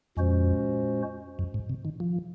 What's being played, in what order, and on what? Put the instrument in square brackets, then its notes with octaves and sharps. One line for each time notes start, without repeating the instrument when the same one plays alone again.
[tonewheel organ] F2 [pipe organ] A#2 G#3 C#4 F#4 C5
[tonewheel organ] F#2
G#2
C3
D#3
F3